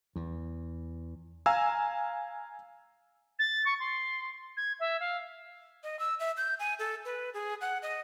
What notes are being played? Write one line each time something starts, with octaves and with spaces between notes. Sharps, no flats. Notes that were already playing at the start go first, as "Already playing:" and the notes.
E2
F5 G#5 A#5 E6
A6
C#6
C6
G#6
E5
F5
D#5
E6
E5
G6
G#5
A4
B4
G#4
F#5
D#5